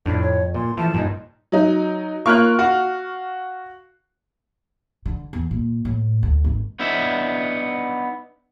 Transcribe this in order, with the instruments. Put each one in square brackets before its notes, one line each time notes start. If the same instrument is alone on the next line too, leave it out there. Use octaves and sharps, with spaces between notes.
[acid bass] F2 [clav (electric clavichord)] A2 [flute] D4
[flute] C#5
[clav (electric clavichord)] A#2 [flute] C6
[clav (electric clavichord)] E3 A3 [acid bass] F3 [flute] A5
[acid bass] G2 [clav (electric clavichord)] A#2 D#4
[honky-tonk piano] F#3 D#4
[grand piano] A#3 F4 A#4 [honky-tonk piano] C#6 F6 F#6
[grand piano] F#4 F5
[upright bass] D3
E2
A#2
A2
D2
G#1
[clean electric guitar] B3 D4 D#4 E5